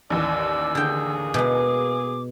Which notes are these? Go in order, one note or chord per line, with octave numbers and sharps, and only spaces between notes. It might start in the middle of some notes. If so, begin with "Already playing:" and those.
A1 D#2 E3 D5 E6
D3 A#3 G#4 G5
B2 G#3 D6